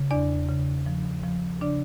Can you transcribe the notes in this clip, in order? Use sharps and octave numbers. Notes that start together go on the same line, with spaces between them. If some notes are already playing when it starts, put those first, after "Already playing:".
Already playing: C#3
E2 D4 D5
C#3
F3
F3
C#3 D4 D5